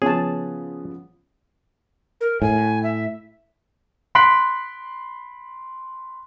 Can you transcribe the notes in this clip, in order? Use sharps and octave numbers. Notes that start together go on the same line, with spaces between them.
C#3 F3 B3 G#4 C#5 A5
A#4
A2 G#5
E5
B5 C6 F#6 B6 D7 F#7